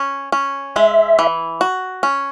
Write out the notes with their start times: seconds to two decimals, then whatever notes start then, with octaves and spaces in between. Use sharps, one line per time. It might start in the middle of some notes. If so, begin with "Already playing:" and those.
Already playing: C#4
0.32 C#4
0.76 G#3 E5
1.19 E3
1.61 F#4
2.03 C#4